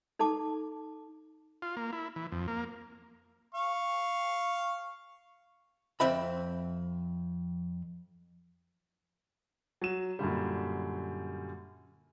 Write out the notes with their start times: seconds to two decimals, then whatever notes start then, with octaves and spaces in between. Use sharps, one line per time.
0.19 D#4 A4 A5 D6
1.62 F4
1.77 A#3
1.93 E4
2.16 E3
2.32 F2
2.48 A#3
3.55 F5 C#6
6.00 F2 C4 E5 B5
9.81 F#3 E7
10.19 F#2 A#2 D3 G3